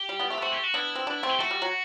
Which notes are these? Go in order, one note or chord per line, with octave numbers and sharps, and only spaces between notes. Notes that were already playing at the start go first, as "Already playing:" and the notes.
Already playing: G4
G3
G3 B3
A3 C4
B3
A3 C4 F#4
G4
F#4
B3 D4 E4
C4
B3 D4
A3 C4
G4
A3 F#4
G3
F#3